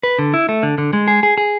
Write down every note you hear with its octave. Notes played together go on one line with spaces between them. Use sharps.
B4
D3
E4
A3
D3
D3
G#3
G#4
G#4
G#4